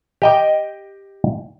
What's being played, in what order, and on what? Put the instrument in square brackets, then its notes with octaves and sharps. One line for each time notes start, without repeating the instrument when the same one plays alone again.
[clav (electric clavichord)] G4 D#5 G5